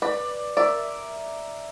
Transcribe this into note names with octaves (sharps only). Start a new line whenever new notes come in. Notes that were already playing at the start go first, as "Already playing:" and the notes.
B4 D5
A#4 D5 E5